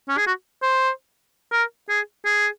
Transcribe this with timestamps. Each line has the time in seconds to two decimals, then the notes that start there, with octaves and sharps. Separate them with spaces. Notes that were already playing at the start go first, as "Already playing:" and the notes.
0.09 C#4
0.17 G#4
0.27 F#4
0.62 C5
1.52 A#4
1.89 G#4
2.25 G#4